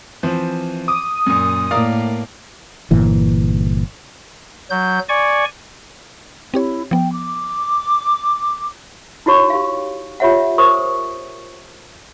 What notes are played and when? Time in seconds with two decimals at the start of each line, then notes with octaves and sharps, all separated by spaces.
0.23 E3 F3 C4
0.88 D6 D#6
1.26 F#2 A#2
1.71 A2 A#3 A#4 D5 F5
2.91 G1 A#2 E3
4.70 F#3 G6
5.09 D5 G#5 C#6
6.54 C4 E4 G4 C#5
6.91 F3 B3 G5
7.13 D6
9.26 D#4 E4 F#4 C#5 C#6
9.50 G4 F5
10.20 F4 G4 C#5 E5 F#5
10.58 A#4 C5 C#6 D#6